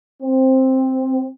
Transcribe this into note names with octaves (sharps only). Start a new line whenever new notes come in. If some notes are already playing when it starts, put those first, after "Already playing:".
C4